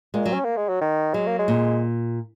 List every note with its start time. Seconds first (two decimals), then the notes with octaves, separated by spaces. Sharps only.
0.14 A#2 G#3
0.25 F#3
0.33 C#4
0.45 A#3
0.57 G#3
0.69 F#3
0.81 D#3
1.14 F#3 G#3
1.27 A#3
1.39 G#3
1.48 A#2